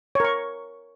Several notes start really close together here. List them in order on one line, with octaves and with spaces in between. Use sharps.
C#5 A#4 C#6